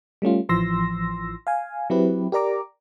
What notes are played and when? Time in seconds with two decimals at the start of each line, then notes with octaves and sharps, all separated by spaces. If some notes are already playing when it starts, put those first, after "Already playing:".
0.22 G3 A3 C#4 F4
0.49 A1 E3 F3 C6 E6 A#6
1.47 F5 G#5
1.90 F#3 C4 E4 G4 B4
2.32 G4 A#4 D5 A#5 D6